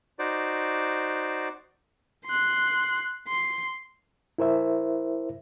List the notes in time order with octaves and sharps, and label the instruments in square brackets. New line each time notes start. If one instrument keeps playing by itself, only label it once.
[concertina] D#4 F#4 C5 D5
[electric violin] C6 F#6
C6
[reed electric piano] E4 A#4 C5 E5